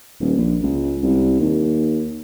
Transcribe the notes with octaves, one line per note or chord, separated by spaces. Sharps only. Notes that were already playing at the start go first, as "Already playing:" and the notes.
D#1
A#1
C#2
C2
D#2